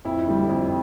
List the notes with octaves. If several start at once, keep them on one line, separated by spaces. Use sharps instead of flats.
F2 E4
D3 G3
F2